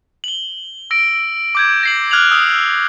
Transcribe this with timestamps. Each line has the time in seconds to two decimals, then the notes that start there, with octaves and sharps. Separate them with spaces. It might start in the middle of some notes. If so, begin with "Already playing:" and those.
0.24 F#7 G7
0.91 E6 A#6 D7
1.55 D6 G6 G#6
1.83 A#6 C7 F#7
2.11 F6 F#6 G#6 F7 F#7
2.31 D#6 E6